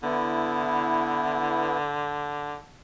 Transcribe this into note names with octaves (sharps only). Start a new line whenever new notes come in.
D3 B3 E4